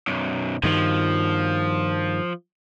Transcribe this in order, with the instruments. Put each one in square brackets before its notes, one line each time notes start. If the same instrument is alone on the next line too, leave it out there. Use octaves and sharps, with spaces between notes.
[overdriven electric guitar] B1 F#2
[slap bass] G2 D#3 [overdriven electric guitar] F3